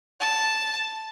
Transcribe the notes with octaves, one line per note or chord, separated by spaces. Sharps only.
A5